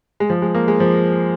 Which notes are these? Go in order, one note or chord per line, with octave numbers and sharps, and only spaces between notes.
G#3
F3
G#3
A#3
G#3
F3